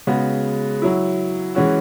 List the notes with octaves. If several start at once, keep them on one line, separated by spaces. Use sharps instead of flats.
C#3 G#3 B3 F#4
F#3 E4
E3 G#3 C#4 F#4